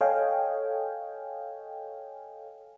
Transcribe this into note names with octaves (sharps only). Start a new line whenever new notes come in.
A4 C#5 D#5 F5 G5 G#5